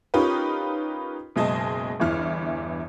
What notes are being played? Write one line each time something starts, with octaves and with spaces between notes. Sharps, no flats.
C#4 D#4 F4 G4 A#4 B4
F#1 B2 G#3 D#5 G#5 A5
G1 E2 E3 F6